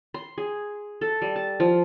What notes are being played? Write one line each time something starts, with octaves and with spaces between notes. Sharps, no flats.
C6
G#4
A4
G3
A5
F3